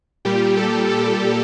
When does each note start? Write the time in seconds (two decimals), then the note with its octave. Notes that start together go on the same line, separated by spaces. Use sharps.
0.25 A#2 G3 G4
0.57 A4
0.90 A4